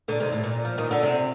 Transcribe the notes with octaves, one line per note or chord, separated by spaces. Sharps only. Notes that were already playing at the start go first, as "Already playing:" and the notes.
A#2 D3
C3 D#3
A2
A#2
F3
D#3
D3
C3